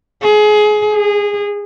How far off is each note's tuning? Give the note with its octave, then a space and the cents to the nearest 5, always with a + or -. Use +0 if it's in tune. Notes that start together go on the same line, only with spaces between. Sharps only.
G#4 +25
G#4 -20